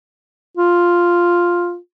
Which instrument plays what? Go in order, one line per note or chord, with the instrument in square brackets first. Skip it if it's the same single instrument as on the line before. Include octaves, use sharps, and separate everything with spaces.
[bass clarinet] F4